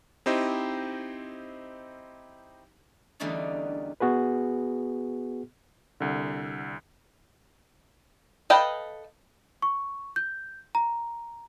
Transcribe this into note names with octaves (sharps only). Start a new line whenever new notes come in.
C4 D#4 E4 G4 C5 D#5
E2 D3 G3 A3 C#4 D#4
B3 F#4 G#4 B4
C2 D3
A4 B4 D#5 F5 G5
C#6
G6
A#5